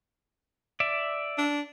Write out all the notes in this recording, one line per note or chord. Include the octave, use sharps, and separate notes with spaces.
D5 E5
D4